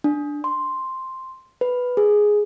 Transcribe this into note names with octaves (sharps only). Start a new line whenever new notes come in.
D4
C6
B4
G#4